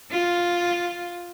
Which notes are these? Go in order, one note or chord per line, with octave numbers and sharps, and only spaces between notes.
F4